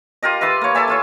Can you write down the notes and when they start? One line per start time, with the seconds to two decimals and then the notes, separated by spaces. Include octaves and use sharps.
0.23 F4 G4 A#4 D#5
0.41 B4 E5 C6 D6
0.61 A#3 C#5
0.75 A4 D5 E5 G#5
0.88 E4 F4 C#5